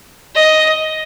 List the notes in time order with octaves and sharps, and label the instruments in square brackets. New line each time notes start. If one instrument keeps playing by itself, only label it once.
[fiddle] D#5